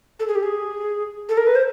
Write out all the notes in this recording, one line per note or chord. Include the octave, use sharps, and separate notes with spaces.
A4
G#4
G4
G#4
A4
A#4
B4
C5